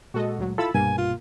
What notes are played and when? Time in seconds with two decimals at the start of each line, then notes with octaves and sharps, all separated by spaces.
0.14 A#2 G#3 F#4 A4 D#5
0.38 D2 F#3
0.58 E4 F4 A4 B5 E6 A6
0.74 C2 G2 B2 A#3 G#5
0.98 F4